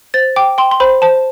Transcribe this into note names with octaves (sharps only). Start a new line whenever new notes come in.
C5 A6
G5 D6
G5 C6
C6
C5 B5
C5 A5